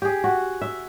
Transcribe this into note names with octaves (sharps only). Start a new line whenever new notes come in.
G4 G#4
F#4
E5